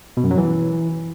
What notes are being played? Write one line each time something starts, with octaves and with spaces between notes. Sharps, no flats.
B2
F#2
F#3
E3